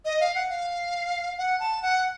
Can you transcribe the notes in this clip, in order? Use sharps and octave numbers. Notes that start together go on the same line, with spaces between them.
D#5
F5
F#5
F5
F#5
A5
F#5